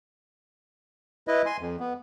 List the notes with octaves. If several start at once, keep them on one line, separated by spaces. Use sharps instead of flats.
E4 B4 D#5
G#5 C6
F2
B3